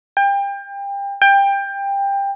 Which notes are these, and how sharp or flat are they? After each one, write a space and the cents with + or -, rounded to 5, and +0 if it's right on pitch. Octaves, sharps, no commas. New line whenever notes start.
G5 +30
G5 +20